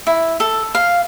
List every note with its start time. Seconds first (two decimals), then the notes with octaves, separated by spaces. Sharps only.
0.07 E4
0.40 A4
0.75 F5